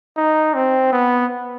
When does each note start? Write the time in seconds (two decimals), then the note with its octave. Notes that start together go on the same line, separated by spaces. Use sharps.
0.17 D#4
0.54 C4
0.92 B3